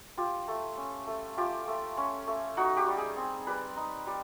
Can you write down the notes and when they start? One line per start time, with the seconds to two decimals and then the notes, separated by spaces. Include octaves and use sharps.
0.17 F4 G4
0.48 A3
0.77 C#4
1.07 A3
1.37 F4 G4
1.67 A3
1.97 C#4
2.27 A3
2.57 D#4 F#4
2.77 G4
2.87 G3
2.97 G#4
3.17 C4
3.47 G3 B4
3.76 D#4
4.07 G3